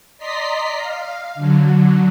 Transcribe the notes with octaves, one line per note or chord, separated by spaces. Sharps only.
D5 D#5 A#5 C6 B6 C7
F5
D3 F#3